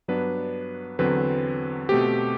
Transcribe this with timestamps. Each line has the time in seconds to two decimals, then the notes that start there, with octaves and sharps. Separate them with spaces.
0.08 G2 F#3 B3 D4 B4
0.99 E2 D3 F#3 C4 B4
1.89 B2 A3 C4 G4